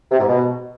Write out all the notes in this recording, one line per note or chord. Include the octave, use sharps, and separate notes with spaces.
C3
G#2
B2